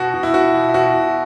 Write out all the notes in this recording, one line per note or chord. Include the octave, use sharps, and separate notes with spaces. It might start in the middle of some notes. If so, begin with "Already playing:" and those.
Already playing: B2 F#4
B2
E4
B2 F#4
B2
E4
B2 F#4
B2